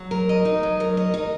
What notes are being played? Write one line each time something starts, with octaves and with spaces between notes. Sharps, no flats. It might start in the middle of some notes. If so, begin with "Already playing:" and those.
Already playing: F#3
A#4
D#5
D#4
F#3
A#4
D#5
D#4